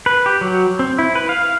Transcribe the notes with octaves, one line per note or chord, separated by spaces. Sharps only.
B4
G4
F#3
C4
E4
B4
F5